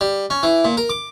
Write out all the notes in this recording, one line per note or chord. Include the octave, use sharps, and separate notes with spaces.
G3
C#4
E3
A#2
A#4
D6